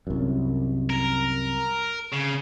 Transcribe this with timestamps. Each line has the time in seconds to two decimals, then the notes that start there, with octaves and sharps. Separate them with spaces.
0.07 C2 F#2
0.90 A#4
2.12 C#3